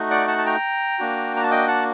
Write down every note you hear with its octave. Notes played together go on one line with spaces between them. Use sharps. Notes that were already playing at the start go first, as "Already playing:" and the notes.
Already playing: A3 D#4 F#4
D5 F#5
F#5 A5
A5
G5 A#5
A#3 D4 F#4
A#5
A5
D#5 G5
F#5 A5